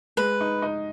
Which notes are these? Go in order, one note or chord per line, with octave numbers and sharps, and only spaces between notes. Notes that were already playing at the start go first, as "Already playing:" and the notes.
G#3 B4
D#4
D#4